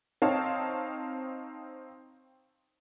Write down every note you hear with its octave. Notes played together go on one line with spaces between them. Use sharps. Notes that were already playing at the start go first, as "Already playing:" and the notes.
C4 D#4 C#5 F5 A5